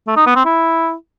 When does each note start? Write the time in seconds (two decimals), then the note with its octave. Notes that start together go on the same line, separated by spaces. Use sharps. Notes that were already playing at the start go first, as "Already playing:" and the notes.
0.07 A3
0.17 D#4
0.26 B3
0.36 C4
0.45 E4